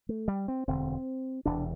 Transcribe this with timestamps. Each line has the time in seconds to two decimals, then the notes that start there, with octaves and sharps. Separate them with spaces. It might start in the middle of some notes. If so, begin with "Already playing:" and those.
0.09 A3
0.28 G3
0.48 C4
0.67 E1 D2 D3 C4
1.46 E1 E2 C3 D4